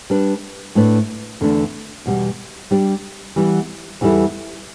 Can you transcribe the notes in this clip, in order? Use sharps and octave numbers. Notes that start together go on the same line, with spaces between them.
G3 D4 B4
A2 A3 D4 B4 D5
E2 D3 A3 D4
E2 B2 G3
G3 D4 G4 D5
E3 G3 B3
E2 E3 G3 E4 A4